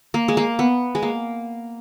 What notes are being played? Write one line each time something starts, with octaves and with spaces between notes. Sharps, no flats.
A#3
G#3
A#3
B3
G#3
A#3